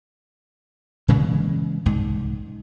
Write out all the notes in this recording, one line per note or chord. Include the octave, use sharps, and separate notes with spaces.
A#2 C#3 E3 G#3
C2 G#2